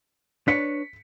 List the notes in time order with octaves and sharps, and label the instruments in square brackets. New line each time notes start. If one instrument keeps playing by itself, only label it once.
[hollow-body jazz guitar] D4 B4 C#5 [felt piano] B6 C#7